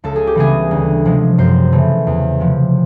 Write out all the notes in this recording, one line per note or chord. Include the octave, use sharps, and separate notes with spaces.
C#2 A4
G#4
G4
C#3 E3 G3 B3 G#4
D2
C3 F3 G#3
F#2 C5
C#3 E3 A3
E2
C3 F3